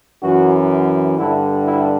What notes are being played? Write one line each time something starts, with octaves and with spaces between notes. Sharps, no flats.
F#2 E3 F#4
G2 D3 E4
E4